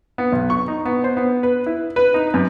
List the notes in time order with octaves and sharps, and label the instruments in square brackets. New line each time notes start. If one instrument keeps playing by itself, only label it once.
[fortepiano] B3
B1
C#6
D#4
B3
C5
B3
B4
E4
B4
D#4
F#2